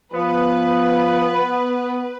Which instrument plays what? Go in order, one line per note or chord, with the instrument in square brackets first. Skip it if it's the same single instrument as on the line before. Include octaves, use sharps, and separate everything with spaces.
[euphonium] F3 [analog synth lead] B3 [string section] B4